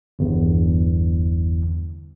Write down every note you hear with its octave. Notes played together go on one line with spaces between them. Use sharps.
G1 E2